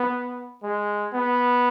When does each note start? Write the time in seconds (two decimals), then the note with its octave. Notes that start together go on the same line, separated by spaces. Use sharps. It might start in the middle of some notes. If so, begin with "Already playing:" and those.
Already playing: B3
0.63 G#3
1.13 B3